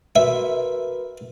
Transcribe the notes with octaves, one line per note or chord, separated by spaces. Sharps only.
F#4 A#4 B4 E5